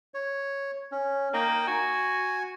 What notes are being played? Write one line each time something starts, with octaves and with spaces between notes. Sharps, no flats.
C#5
C#4
A#3 D#4 D#5 G5
F#4 G#5